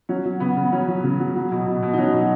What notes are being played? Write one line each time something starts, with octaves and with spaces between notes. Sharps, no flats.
F#3 C#4
F#3
C#3 B3
C#3
F#3 C#4
F#3
C#3
F#3
F#3
B2
B2
B2
D#4
F#3 C#4
B2